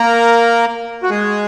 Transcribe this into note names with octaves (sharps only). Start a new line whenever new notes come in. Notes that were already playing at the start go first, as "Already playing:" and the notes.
Already playing: A#3 A#4
F#4
G#3 G#4